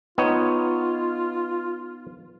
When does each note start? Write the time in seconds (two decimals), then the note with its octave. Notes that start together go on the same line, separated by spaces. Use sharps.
0.18 B3 D#4 F4 C#5